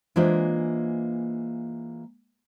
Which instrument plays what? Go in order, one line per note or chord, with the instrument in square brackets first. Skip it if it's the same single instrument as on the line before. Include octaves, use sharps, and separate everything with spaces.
[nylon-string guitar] E3 G#3 A#3 D4 F4 C5